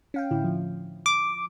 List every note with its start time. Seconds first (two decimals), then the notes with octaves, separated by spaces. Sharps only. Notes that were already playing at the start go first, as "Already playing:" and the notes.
0.14 C#4 F5 G5
0.31 A2 D3 E4
0.44 F3
1.06 D6